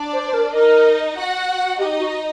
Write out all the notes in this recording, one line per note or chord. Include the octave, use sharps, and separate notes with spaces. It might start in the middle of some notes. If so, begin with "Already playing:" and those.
Already playing: D4 D5
C5
C5
A#4
D#4 A#4 D#5
F#4 F#5
D#4 G4 D#5
F#4